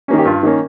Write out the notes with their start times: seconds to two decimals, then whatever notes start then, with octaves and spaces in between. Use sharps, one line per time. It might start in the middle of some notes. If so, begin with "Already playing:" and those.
0.08 D#3 A#3 C#4
0.18 G4
0.25 G2 F4
0.43 D#3 A#3 C#4